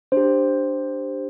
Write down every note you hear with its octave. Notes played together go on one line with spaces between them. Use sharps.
D4 G4 C5